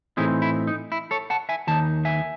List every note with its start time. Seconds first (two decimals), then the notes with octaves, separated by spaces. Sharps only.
0.17 A2 E3 C4 D#4 E4 G#4
0.42 E4
0.67 D#4
0.92 E4
1.11 A4 C#5
1.30 F#5 A5
1.49 E5 G#5
1.67 D#2 D#3 D#4 A5
2.05 E5 G#5